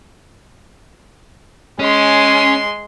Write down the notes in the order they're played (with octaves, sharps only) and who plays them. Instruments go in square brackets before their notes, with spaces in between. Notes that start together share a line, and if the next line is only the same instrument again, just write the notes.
[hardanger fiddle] G#3 C6 [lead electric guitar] C#4